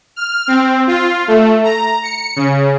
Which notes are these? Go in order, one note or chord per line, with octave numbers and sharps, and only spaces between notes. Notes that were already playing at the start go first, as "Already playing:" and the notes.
F6
C4
F4
A3
A#5
C#7
C#3